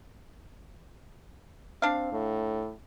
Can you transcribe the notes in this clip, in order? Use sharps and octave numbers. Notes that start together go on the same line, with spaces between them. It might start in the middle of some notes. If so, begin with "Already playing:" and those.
C4 D4 F5
A2